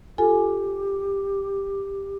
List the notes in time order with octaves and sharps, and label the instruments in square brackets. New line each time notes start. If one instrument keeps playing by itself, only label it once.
[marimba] F4 A4 G#5 [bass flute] G4